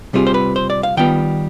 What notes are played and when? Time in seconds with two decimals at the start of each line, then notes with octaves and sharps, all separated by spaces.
0.13 C3 G3 C4 F4 G#4
0.27 C5
0.34 B4
0.56 C5
0.70 D5
0.83 F5
0.97 D#3 G3 B3 F4 G5